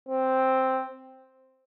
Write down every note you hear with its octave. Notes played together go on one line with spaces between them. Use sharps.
C4